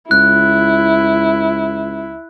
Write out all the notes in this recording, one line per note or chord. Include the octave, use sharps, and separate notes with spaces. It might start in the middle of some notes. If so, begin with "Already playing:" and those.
C#2 E4 F#6